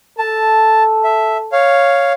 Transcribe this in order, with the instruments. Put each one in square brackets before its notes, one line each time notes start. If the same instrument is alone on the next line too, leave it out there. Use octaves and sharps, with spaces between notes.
[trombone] A4 [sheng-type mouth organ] A5
[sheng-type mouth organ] E5
C#5 F5